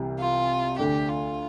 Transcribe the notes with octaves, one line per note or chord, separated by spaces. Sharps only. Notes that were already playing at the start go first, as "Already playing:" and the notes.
Already playing: C2 C3 E3 G3
F4
D2 D3 A3 D4 G4
F4